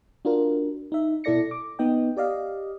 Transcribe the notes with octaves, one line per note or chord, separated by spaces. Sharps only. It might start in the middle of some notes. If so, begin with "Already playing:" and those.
D4 F4 F#4 A#4
D#4 E5
B2 E4 A4 D5 A#6 C#7
D6
B3 D#4 D#5 G5
G4 D5 D#5 F5